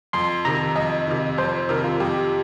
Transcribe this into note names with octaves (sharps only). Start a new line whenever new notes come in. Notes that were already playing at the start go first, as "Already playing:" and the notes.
F2 C6
C3 D#3 A#5
F2 D#5
C3 D#3
F2 C5
C5
C3 D#3 A#4
F4
F2 G4